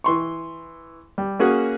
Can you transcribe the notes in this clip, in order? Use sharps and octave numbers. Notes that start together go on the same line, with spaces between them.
E3 C6 C#6
G3
A#3 C#4 F#4 G#4